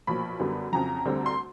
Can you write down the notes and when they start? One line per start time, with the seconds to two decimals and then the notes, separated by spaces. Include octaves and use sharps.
0.07 B1 A#2 F3 B5
0.39 F#2 D3 G3 B3
0.72 F2 C#3 F#3 A#5
1.05 D2 D3 G3 C4
1.26 C6